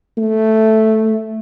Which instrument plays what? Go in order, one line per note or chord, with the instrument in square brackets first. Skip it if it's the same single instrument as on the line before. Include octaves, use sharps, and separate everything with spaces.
[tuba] A3